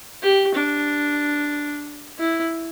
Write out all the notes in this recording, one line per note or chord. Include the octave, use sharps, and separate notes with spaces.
G4
D4
E4